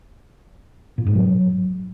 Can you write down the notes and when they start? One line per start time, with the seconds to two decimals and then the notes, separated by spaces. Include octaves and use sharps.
0.98 A#2
1.06 G#2
1.15 F#3